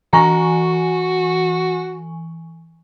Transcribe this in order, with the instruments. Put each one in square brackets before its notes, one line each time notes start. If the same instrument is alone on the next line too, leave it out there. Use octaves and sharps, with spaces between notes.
[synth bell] E3 G#5 C#6 [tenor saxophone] F#4 [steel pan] A#5